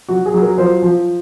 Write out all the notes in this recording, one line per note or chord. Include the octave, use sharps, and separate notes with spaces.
F#3 F#4
G#4
F#3
A#4
F3 C5
F3